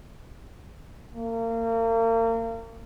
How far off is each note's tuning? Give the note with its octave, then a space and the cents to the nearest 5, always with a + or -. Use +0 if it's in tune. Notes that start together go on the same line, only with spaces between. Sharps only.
A#3 -35